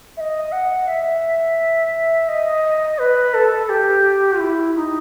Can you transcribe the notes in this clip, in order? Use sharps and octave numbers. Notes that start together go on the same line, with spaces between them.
E5
D#5
F#5
E5
D#5
B4
A4
G4
E4
D#4